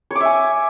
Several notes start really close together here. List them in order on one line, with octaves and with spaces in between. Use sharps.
C#5 D6 E5 G#5